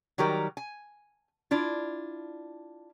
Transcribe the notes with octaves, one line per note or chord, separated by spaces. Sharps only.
D#3 F#3 G3 G4 A#4
G#5
D4 E4 F4